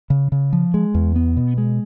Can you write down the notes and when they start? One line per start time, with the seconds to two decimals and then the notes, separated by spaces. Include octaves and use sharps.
0.10 C#3
0.32 C#3
0.53 F3
0.74 G#3
0.94 E2
1.16 B3
1.37 B2
1.58 G#3